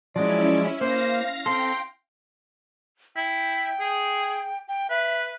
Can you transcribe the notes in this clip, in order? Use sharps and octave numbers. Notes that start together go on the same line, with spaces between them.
F3 F#3 G#3 C#4 E4 D5
A#3 C5 F5 A#6
C4 A4 G5 C6
E4 G5
G#4
G5
B4 E5